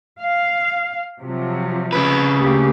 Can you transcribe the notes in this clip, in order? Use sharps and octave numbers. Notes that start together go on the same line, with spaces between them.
F5
C3 F3 F#3
C#3 B4
D2 A#3 G4